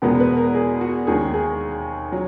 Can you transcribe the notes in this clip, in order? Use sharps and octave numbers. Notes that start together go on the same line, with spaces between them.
E2 B2 G#3 B3 A#4
B4
A#4
G#4
F#4
D#2 D#3 G#3 G#4
G#4
F#3